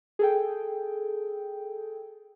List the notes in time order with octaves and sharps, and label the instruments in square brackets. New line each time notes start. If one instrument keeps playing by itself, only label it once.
[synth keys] G#4 A4 G5